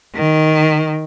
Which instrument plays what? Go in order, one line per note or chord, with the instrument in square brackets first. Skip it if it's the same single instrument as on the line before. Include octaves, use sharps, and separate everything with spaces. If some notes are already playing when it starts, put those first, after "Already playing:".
[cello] D#3